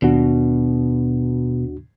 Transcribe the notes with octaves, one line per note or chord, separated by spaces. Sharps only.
D#2 B2 D4 F#4